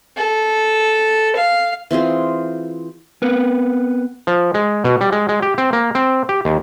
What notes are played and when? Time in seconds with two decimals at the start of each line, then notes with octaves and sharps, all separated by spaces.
0.17 A4
1.36 F5
1.91 E3 C4 F4 G#4
3.22 B3 C4 A#4 B4
4.27 F3
4.54 G#3
4.84 B2
5.01 G3
5.12 G#3
5.29 G#3
5.42 G4
5.58 C4
5.73 A#3
5.95 C4
6.29 G4
6.45 D#2